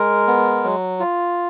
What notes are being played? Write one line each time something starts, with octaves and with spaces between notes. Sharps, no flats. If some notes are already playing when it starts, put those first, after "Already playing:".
Already playing: G#3 A#4
B3
F#3
F4